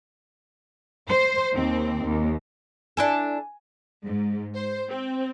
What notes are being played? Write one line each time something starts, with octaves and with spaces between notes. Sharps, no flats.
C5
D#2 C4
D#2
D4 E4 A4 G#5
G#2
C5
C4